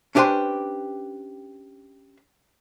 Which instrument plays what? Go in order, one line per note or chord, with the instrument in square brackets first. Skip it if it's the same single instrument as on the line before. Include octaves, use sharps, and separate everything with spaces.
[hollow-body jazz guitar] C#4 D4 G4 B4 C5 C6